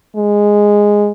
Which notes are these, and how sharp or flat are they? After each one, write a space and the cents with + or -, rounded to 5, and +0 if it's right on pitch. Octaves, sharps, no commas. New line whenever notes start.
G#3 -5